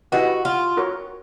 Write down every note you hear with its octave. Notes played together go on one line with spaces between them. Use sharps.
E4 F#4 G4 B4 D#5 F#5
F4
F#4 A#4 C#5